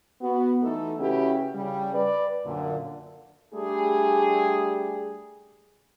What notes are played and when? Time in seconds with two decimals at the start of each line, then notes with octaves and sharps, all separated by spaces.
0.21 B3 F#4
0.62 E3 A3 D#4 A4
0.99 C#3 C#4 E4 F#4 G4 B4
1.54 C#3 G3
1.94 B4 D5
2.45 F#2 A#2 D3
3.54 G3 A3 D4 G4 G#4